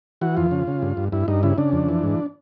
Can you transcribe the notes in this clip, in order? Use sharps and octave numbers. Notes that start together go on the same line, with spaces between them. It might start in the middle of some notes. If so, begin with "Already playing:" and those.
E3 F#4
F2 F4
C#3
C#3
G2
G2
G2 E4
G2 D#4
C#3 E4
C#3 D4
F2
E3
G#2